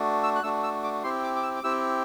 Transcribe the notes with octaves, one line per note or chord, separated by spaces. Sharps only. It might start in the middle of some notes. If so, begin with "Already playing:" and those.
Already playing: A3 D4 F#4
E6
F#6
A3 D4 F#4 E6
E6
D6
C4 E4 G4 C6
D6
D6
E6
D6
C4 E4 G4 E6